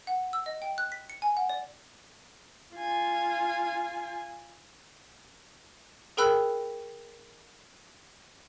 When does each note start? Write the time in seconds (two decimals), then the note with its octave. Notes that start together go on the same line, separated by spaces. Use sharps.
0.07 F#5
0.33 E6
0.46 D#5
0.62 G5
0.78 F#6
0.92 B6
1.10 C#7
1.22 G#5
1.37 F#5
1.49 D5
2.75 F4 G#5
6.17 G#4 A#4 G5 B5 E6 F#6